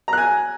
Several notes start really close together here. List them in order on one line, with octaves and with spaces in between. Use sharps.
A#5 F#6 G#5